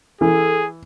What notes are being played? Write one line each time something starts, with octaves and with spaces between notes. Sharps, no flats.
E3 G#4 A4